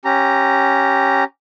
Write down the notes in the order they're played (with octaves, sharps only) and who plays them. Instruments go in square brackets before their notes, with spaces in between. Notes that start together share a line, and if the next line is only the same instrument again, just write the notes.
[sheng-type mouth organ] C#4 G4 A#5